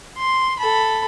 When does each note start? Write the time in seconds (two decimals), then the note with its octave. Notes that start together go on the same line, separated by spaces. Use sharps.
0.17 C6
0.59 A4 B5